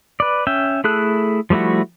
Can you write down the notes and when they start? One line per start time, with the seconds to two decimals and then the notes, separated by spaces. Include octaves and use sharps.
0.20 B4 D5
0.47 C#4 E5 G5
0.84 A3 E4 G#4 A4 F#6
1.50 F3 G3 A3 E4 F#4